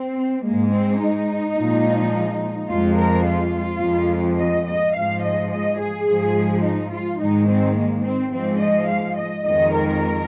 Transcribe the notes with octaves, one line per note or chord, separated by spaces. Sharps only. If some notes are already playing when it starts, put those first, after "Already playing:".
Already playing: C4
G#2 G#3 A#3
C4
D#4
A#2 F3 G#3
F2 F3 G#3 F4
A#4
F4
F2 F3 G#3
D#5
D#5
G#2 F3 G#3 F5
D#5
D#5
G#4
G#2 F3 G#3
D#4
F4
G#2 D#3 G#3 D#4
C4
A#3
C4
G#2 F3 G#3 C4
D#5
F5
D#5
F2 D#3 G#3 D#5
A#4